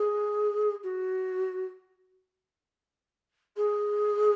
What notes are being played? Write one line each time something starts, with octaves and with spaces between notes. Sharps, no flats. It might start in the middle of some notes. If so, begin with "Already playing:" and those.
Already playing: G#4
F#4
G#4